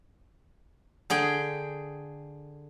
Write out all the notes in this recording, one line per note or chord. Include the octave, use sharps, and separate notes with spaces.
D3 G#4 G5